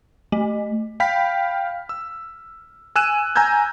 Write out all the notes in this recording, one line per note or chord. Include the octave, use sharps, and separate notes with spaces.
A3
F5 G5 B5 F6 B6
E6
G#5 E6 F#6 D#7 E7
G#5 A#5 E6 G6 G#6